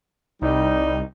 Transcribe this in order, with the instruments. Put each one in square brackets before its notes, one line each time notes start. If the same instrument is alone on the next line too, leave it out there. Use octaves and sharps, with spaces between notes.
[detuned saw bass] C2 [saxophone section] G3 D#4